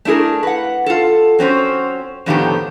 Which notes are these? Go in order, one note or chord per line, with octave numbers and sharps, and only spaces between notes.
A3 D4 E4 G#4 A#4
B4 F#5
F4 A4
F#3 C4 C#4 C5
F2 A2 D3 D#3 B3 G4